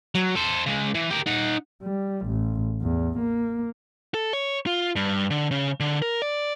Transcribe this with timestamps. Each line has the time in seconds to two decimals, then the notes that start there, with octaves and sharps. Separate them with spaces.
0.15 F#3
0.35 A4 C5
0.66 C#3 G#3
0.95 E3
1.10 G4 A#4
1.26 D#4 F#5
1.82 G3
2.26 A1
2.82 E2
3.19 A#3
4.14 A4
4.33 C#5
4.67 F4
4.96 G2
5.30 D3
5.51 C#3
5.80 D3
6.02 A#4
6.22 D5